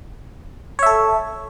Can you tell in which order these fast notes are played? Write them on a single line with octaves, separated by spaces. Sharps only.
C#5 E5 A4